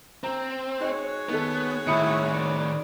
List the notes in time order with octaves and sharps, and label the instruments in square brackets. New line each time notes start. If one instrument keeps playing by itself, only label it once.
[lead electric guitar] C4 [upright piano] A#5
[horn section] G#3 F#4 C#5 [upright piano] D#4
[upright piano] D#3 A4 [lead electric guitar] B3
[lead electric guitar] A2 D#3 [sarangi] E4 [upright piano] B5 D#6 C#7
[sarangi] D5